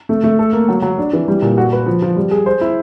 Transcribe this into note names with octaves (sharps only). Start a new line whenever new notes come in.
A3
A3
A4
A#3
F#3
F#3
D4
E3
G3
A#2
F#4
B4
F3
F3
G3
G#4
C5
E4